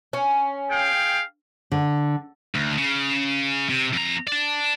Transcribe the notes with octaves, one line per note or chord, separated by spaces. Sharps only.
C#4
G#4 F5 G5
D3
D2
C#3
C3
F2 A#5
D5 A5